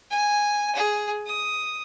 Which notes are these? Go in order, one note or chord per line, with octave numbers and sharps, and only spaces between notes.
G#5
G#4
D#6